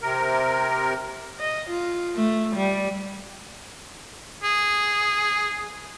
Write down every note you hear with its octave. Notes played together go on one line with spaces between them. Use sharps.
C3 A#4
D#5
F4
A3
G3
G#4